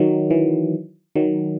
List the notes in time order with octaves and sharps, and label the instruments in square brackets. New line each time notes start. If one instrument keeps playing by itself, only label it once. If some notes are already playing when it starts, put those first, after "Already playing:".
Already playing: [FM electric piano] D#3 F#3
E3
D#3 F#3